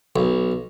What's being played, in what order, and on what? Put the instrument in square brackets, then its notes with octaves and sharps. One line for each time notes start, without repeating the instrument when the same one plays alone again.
[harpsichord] B1